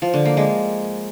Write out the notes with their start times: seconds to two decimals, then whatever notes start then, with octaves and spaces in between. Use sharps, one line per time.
0.02 F3
0.14 D3
0.25 A#3
0.37 G#3